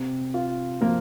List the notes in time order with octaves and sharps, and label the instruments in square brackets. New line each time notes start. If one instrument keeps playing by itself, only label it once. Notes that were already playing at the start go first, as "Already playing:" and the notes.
Already playing: [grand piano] C3
F4
[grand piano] F3 [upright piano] A#3